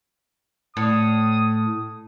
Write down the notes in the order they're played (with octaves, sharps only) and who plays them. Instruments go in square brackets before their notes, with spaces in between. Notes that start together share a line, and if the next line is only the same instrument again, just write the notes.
[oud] A2 [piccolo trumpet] D#6